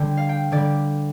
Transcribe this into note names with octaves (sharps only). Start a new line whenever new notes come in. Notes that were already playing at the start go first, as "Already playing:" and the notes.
Already playing: D3 G3 G5
F5
G5
D3 G3 D5